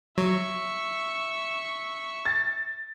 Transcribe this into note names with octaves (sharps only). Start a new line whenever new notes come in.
F#3 E5 C#6
A6